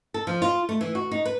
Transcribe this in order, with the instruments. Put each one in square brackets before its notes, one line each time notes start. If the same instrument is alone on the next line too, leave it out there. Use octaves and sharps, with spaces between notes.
[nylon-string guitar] A4
F3
F4
A3
E3
F#4
D#4
B4